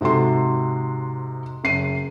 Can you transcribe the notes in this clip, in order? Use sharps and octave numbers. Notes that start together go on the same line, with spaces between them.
G#2 C3 F#4 A4 C6
F#1 C7 D#7